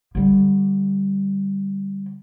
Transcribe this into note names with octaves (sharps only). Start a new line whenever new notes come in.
D3 G3